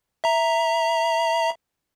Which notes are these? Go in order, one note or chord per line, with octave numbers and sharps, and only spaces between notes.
E5 A#5